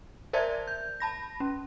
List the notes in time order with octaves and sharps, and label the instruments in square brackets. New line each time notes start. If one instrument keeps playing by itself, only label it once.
[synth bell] A#4 C5 D5 E5 A5 G#6
G6
A5 B5 A#6
C#4